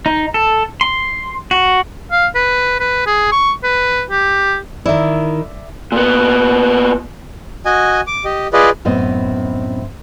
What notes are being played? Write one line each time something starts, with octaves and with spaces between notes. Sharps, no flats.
D#4
A4
C6
F#4
F5
B4
B4
G#4
C#6
B4
G4
D#3 E4 D5 E5
A#2 B3
F#4 D#5 G#5
D6
G4 D#5
F4 G#4 B4 D5 D#5
F#2 A2 B3 C4 D#5